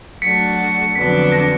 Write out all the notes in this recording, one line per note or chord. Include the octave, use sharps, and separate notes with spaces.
F#3 A3 D4 F#4 B6 C#7
F2 D3 F#3 B3 D4 B6
A#6